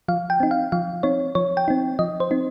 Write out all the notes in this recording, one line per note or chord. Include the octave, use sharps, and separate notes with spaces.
F3 F5
G5
C4 D#4
F5
F3 F5
C4 D#4 C#5
F3 C#5
G5
C4 D#4
F3 D#5
C5
C4 D#4